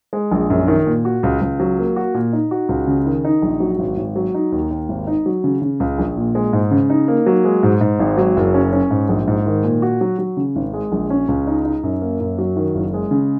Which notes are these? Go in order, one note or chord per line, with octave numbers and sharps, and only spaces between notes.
G#3
A#1
F#2
D#3
A#2
F#4
C#2
C#2
F#3
A#3
F#4
A#2
D#4
F#4
C#2
C#3
D#3
D#4
A#1
F#3
G#1
G#1
F#3
D#4
D#2
D#2
G#1
D#4
F#3
C#3
C#3
C#2
A#1
A#2
G#3
G#2
C#3
D#4
A#3
F#3
G#3
G#2
G#2
G#1
F#3
F#1
C#4
C#4
G#2
A#1
G#2
D#3
A#2
F#4
F#3
F#3
C#3
G#1
G#3
A#1
C#4
C#2
D#4
D#4
F#2
A#3
F#2
F#3
D#3
F#1
G#3
C#3